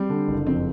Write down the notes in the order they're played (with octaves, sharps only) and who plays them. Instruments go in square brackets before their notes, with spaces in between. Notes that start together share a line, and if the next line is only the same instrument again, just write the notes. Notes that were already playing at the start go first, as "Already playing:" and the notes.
Already playing: [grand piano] G3 [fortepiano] C4
[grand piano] D3
F#1
[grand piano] F2 [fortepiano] C4